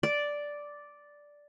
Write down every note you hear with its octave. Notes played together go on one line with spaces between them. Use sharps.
D5